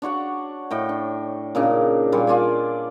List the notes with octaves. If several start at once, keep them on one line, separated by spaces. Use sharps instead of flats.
D4 F#4 C#5 F#5
A2 D#5 G5
D4
A#2 C#3 D4 D#4
A#2 G3 F4 G#5
D4 F4 D5 G#5